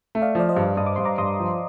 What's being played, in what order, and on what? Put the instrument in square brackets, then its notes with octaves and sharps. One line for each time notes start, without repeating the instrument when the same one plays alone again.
[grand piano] A3
[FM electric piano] D5 F5
[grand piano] F3 [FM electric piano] D5
[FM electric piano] C5 D#5
[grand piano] G2
[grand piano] G2 [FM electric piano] D#6
[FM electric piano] D6
[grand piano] G2 [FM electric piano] C6
[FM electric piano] A#5 D6
[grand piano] G2 [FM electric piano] C6 D#6
[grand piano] F3